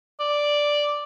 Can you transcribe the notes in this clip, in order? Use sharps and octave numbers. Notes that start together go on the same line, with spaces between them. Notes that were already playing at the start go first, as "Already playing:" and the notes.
D5